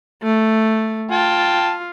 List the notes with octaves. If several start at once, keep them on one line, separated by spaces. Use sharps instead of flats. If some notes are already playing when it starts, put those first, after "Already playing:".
A3
F4 G5 A5